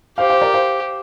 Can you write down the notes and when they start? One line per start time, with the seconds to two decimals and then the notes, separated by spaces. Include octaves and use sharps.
0.18 G4 C5 F5
0.30 C5 F5
0.42 A#4 D5
0.54 C5 F5